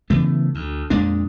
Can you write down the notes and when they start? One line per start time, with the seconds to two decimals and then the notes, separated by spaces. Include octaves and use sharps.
0.10 C#3 E3 A3 B3
0.55 D2
0.90 F2 A#2 G#3 D4